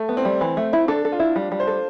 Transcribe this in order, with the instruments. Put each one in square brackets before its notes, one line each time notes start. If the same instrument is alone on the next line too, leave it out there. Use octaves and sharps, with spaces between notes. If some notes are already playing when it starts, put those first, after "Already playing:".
Already playing: [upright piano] A3
[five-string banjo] B3
[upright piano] C4
[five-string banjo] G3
E3
A3
E4
[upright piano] D4 [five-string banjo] A4
[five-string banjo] A4
[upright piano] F4
[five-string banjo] E4
G3
G3
[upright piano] C5
[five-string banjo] A4